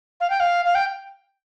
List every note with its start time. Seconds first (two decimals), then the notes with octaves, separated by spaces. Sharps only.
0.20 F5
0.30 G5
0.40 F5
0.65 F5
0.75 G5